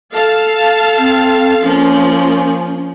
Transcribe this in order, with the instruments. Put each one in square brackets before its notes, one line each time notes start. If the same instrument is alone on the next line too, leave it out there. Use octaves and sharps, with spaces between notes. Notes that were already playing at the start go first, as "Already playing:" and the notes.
[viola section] A4 F5 A5
[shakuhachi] C4
[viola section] F3 A#3 [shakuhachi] C#4